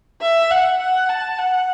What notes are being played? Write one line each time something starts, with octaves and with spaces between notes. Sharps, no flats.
E5
F#5
F#5
A5
F#5